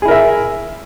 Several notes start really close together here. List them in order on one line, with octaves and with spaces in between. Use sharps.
G#4 E4 A#4 E5